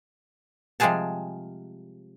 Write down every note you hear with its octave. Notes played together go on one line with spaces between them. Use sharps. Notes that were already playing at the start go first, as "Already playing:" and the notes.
C3 F3 G3 G#3 G#4 A5